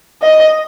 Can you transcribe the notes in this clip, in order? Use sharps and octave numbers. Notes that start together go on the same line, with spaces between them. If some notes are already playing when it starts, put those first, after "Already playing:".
D#5